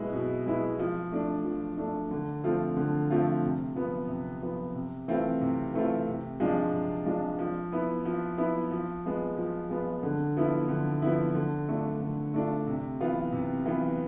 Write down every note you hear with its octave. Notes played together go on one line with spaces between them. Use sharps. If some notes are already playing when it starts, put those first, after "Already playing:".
Already playing: B2 G#3 B3 E4
B2
G#3 B3 E4
F3
A3 D4
F3
A3 D4
D3
F3 A3 C4 F4
D3
F3 A3 C4 F4
C3
F3 B3
C3
F3 B3
C3
E3 A3 C4 F4
C3
E3 A3 C4 F4
C3
F3 G#3 D4 F4
C3
F3 G#3 D4 F4
F3
B3 E4
F3
B3 E4
F3
G#3 B3 F4
F3
G#3 B3 F4
D3
F3 B3 E4
D3
F3 B3 E4
D3
A3 D4 F4
D3
A3 D4 F4
C3
E3 B3 F4
C3
E3 B3 F4